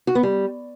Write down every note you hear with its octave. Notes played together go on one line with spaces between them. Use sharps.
F#4
B3
G3